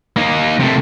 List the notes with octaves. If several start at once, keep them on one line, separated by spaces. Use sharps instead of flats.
A#3 D#4
C3 A3